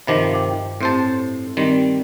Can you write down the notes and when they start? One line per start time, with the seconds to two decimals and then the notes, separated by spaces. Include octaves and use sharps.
0.07 G2 C3 D#3 F3 D#5 D6
0.34 G5 D6
0.81 A2 C4 G4 C5 A5
1.57 D#3 G3 C4